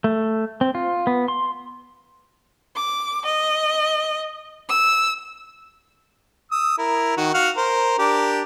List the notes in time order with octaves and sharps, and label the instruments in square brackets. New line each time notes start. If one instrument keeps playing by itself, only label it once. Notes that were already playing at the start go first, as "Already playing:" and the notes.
[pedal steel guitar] A3
C4
F4
B3
C6
[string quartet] D6
D#5
E6
[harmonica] D#6 E6
E4 A#4
D#3 F#4
F#4 F5 F#5
A#4 C5
D4 G4 A#4